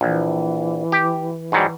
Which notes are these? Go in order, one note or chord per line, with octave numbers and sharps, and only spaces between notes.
A#1 E3
G4
G#2 F#3 G3